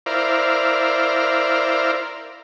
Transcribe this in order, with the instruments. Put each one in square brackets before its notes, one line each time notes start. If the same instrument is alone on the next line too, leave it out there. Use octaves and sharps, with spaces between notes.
[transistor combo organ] E4 A#4 C5 D5 F5